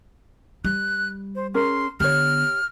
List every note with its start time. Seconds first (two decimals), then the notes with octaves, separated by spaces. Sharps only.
0.65 G3 F#6
1.35 C5
1.54 C#4 G#4 A#4 C6
2.00 D3 B3 G4 C#5 F6